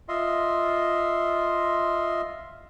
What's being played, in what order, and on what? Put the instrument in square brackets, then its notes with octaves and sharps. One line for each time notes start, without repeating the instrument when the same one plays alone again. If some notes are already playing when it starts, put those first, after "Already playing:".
[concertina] F4 D#5 E5 C6